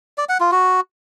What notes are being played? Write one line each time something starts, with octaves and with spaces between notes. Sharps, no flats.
D5
F#5
F4
F#4